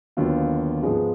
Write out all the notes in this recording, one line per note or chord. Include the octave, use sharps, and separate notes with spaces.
D#2 D3 F#3 B3 F4
G#2 F3 G#3 B3 F4